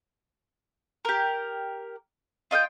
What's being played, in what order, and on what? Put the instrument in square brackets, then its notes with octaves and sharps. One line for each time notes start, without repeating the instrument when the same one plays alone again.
[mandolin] G4 A#4
F4 D#5 F5 G5